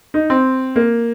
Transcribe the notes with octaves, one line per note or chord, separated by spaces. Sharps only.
D#4
C4
A#3